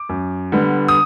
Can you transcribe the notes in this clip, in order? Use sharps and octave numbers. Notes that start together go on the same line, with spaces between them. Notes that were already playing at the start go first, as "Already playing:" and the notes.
Already playing: D6
F#2
D3 G3 B3
D#6